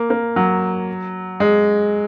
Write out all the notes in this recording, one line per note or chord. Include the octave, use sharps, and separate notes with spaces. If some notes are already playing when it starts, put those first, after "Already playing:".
Already playing: A#3
A#3
F#3
G#3